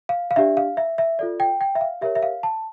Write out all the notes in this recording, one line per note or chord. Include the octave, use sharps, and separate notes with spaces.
F5
F5
D4 G4 D5 E5
F5
E5
E5
F4 A4 D5
G5
G5
E5
F5
G4 A#4 C#5 E5
E5
F5
A5